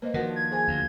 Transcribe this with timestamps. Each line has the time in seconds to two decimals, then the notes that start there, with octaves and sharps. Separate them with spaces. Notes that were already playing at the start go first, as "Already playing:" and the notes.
0.02 A#3 B4 C5 D#5
0.14 D#3 F3 D4 F#4 A#4 B4 F#5
0.36 G#6
0.51 G#4 C5 G#5
0.68 D2 F5